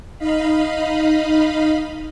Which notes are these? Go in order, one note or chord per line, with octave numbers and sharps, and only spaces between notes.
D#4 D#5 F5 B5